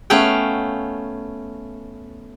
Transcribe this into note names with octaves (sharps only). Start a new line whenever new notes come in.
A3 B3 C#4 F5 G5